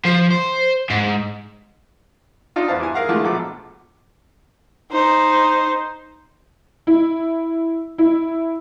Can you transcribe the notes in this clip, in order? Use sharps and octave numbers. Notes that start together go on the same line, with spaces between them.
F3
C5
G#2
D4 D#4 F4
E2 B3 C5 F5 A5
G2 E4 G#5
G#4 A#4 F5 F#5
D3 E3 G#3 A3 F4 A5
A#1 B2 F3 A4 D6
D#4 C5
E4
E4